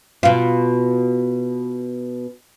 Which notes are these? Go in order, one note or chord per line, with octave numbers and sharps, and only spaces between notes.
B2 F4